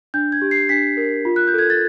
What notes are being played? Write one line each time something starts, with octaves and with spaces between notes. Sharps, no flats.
D4 G6
G#6
G4
C7
D4 B6
A#4
F4
F#6
G6
A4
G#6
A6